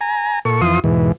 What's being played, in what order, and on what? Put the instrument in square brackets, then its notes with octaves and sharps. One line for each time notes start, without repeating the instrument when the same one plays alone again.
[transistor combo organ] G#5 A#5
A#2 A4 C#6
F2 E3 F4 C6 D#6
E2 G#2 B2 E3